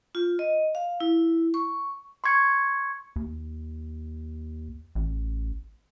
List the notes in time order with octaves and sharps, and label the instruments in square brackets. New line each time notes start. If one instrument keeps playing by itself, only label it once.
[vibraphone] F4
D#5
F5
E4
C#6
[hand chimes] C6 C#6 G#6 C#7
[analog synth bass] D#2
A1